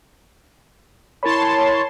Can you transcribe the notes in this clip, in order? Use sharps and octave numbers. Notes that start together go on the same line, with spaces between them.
E4 A#4 C#5 A5 B5 C6